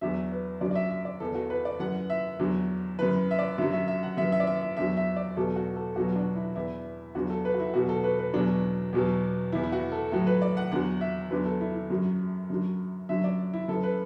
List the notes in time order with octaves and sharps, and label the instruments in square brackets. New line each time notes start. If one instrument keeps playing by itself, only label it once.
[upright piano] E2 D3 F#3 E5
B4
F#2 D3 F#3 D5
D5
E5
E5
D5
E2 E3 A4
F#4
B4
D5
F#2 E3 F#5
E5
E2 D3 F#3
F#2 E3 B4
E5
D5
F#2 D3 F#3 E5
E5
E5
F#5
F#2 E3 E5
E5
D5
E5
E5
E2 D3 F#3 E5
E5
D5
E2 B2 F#3 A4
F#4
A4
E2 B2 F#3 F#4
D4
E4
E2 E3 E4
E2 D3 F#3 F#4
A4
B4
F#4
E4
E2 B2 F#3 F#4
A4
B4
B4
E2 B2 F#3 D4
E2 B2 F#3
E2 E3 E4
E4
F#4
A4
A2 F#3 A4
B4
D5
F#5
E2 D3 F#3 F#5
E5
E2 D3 F#3 B4
A4
E4
E4
F#2 F#3
F#2 D3 F#3
F#2 D3 F#3 E5
D5
E4
F#2 E3 A4
B4